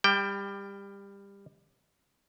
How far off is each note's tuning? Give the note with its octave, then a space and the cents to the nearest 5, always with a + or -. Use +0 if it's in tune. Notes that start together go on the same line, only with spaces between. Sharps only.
G3 +20 G5 +0